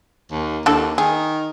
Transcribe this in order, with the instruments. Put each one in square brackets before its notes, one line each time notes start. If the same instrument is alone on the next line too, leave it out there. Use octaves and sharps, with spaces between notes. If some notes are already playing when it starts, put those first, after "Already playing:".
[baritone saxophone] D#2
[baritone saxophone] D#2 [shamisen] D4 E4 A4
[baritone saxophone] D#3 [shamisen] G#4